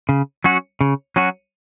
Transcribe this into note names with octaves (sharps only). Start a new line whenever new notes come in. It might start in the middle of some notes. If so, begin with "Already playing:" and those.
C#3
F#3 C#4 F#4
C#3
F#3 C#4 F#4